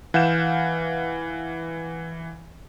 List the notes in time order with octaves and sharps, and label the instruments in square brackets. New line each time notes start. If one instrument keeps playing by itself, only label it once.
[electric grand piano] E3 F5 F#5 G6 E7